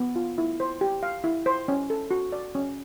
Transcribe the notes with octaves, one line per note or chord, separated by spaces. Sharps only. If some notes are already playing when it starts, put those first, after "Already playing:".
Already playing: B3
F4
E4
C5
G4
F5
E4
C5
C#4
A4
F#4
D5
C#4